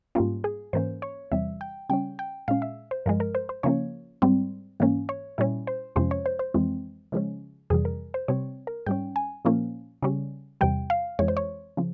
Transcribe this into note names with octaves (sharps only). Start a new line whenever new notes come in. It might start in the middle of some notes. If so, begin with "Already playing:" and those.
G#2 G3 A#3 C#4 F4
G#4
G#2 E3 A#3 C#4 C5
C#5
E2 C3 E3 G3 E5
G5
C#3 G3 C#4 G5
G5
A#2 G#3 C#4 F5
E5
C5
G2 F3 G#3 A#4
A#4
C5
C5
C#3 F3 A#3 C#4 C#5
G#2 G3 C4
G#2 E3 A#3 C#4
C#5
A#2 G3 C#4 E4
C5
F2 C3 F3 G#3 C#4 C5
C#5
C5
C5
F2 E3 G#3 C4
C#3 F3 G#3 C#4
F2 C3 E3 G3 G#4
A#4
C5
C3 G3 C4 C#5
A#4
G#2 G3 C#4 G5
G#5
A#2 F3 A#3 C#4
C#3 G3 C#4
E2 C3 G3 G5
F5
F2 E3 G#3 C#5
C5
C#5
C#3 F3